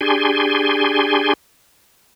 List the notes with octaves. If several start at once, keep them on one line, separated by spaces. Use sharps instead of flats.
D4 G4 G#4 G#5 C6